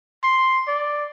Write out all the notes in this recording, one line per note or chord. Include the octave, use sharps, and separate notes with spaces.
C6
D5